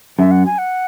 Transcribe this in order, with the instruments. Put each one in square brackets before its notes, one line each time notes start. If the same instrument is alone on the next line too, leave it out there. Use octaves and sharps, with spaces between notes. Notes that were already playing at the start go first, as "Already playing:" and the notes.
[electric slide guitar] F#2 [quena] E5
[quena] F#5
G#5
F#5